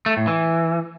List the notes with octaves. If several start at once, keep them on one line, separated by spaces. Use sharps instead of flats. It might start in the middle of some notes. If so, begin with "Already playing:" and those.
A3
A2
E3